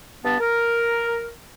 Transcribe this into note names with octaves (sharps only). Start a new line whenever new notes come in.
G2 B3 A5
A#4